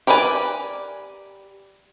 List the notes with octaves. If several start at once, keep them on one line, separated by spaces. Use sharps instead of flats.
G4 A#4 B4 D5 G#5